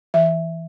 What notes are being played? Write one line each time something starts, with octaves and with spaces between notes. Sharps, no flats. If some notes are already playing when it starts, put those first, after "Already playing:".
E3 E5